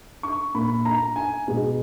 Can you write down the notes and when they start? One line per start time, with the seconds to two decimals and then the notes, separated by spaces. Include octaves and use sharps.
0.23 C#6
0.54 A#2 A#3 B5
0.85 A#5
1.16 G#5
1.47 B2 G#3 B3